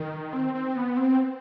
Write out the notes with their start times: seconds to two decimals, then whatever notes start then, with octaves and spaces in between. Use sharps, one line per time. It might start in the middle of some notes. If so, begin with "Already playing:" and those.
Already playing: D#3
0.33 C4
0.54 C4
0.75 B3
0.97 C4